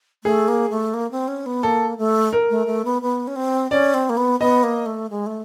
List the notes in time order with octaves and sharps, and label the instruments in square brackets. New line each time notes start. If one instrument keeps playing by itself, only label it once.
[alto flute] A3 [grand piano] G#4
[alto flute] A#3
A3
A#3
C4
C#4
B3
[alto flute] A#3 [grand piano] A4
[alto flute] A3
[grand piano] A#4
[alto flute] A3
A3
B3
B3
C#4
C4
[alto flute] C#4 [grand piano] D5
[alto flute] C4
A#3
B3
[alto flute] B3 [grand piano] D#5
[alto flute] A#3
A3
G#3
A3